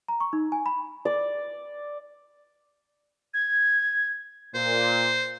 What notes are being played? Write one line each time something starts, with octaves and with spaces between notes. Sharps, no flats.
A#5
C#6
D#4
G#5
B5
D5
G#6
A#2 C5